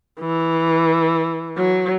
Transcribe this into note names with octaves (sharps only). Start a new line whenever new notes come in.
E3
F#3